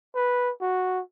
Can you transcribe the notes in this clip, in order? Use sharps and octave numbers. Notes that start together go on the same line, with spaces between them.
B4
F#4